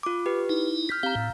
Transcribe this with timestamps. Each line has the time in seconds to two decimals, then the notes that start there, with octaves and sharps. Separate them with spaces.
0.03 F4 D6
0.26 G4 B4
0.49 D#4 E4
0.89 F6 G6 B6
1.03 C4 G4 F5 A#5
1.15 A2